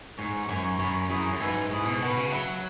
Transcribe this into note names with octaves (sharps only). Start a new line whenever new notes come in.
G#2 C#5 G#5 C#6
F#2 C#5 G#5 C#6
F#2 C#5 G#5 B5
F#2 E4 G#4 C#5
F#2
G#2 B4 E5 G#5
G#2 E4 G#4 C#5
B2
B2 B4 F#5 C#6
C#3
F#3 F#4 E5 B5